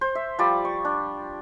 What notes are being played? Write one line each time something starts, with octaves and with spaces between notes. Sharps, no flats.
C5
E5
F3 G3 D5
C#6
D4